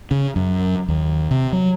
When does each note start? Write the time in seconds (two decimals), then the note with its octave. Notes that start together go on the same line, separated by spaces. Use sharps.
0.11 C#3
0.36 F#2
0.88 D#2
1.31 C3
1.53 F#3